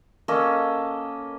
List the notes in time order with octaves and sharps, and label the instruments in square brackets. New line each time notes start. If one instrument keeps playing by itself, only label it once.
[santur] A#3 C#4 A4 D#5